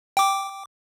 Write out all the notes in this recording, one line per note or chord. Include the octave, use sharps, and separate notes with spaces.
G5 D6